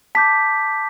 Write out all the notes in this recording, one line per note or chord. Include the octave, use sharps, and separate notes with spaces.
A5 D6 G6 B6